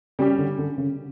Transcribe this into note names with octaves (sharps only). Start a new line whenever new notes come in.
C#3 G3 C#4 G4
D3
D3
C#3